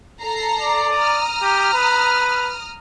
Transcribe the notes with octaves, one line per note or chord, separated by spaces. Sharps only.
A4 A#5 C7
D5
A#5 D#6 F6
G4
B4